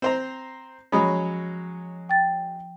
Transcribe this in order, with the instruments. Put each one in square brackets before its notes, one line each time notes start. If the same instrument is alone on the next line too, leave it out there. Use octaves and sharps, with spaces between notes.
[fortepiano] C4 C5 A#5
[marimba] F3 B5 D#6 [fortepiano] F#3 G#3 C#4
[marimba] G5 A6